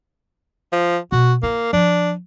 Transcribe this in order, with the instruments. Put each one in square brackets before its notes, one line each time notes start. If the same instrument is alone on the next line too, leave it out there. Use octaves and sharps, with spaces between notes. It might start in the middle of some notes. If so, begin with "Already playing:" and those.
[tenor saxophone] F3
[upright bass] B2 [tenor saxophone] F#4
[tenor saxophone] A#3 [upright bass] E4
[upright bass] F3 [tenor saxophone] D4